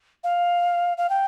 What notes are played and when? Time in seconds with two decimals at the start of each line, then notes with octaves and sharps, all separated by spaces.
0.24 F5
0.98 F5
1.10 G5